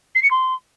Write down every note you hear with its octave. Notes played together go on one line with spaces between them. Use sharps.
C7
C#7
C6